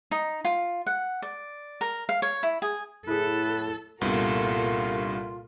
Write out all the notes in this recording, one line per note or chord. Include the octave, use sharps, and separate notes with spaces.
D#4
F4
F#5
D5
A#4
F5
C#5
E4
G#4
A2 E4 G#4 A4 B4
C2 G2 A#2 B3 F4 A4 A#4